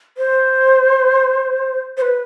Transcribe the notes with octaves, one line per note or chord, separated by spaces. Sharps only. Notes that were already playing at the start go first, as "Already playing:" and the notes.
C5
C5
B4